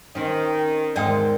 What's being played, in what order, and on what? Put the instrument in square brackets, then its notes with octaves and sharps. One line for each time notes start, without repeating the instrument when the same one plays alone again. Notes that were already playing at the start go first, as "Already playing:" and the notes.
[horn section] D#3 [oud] C4 C#4
[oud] E2 G#2 [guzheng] D#3 G#3 C4 [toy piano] D5 G5 D#6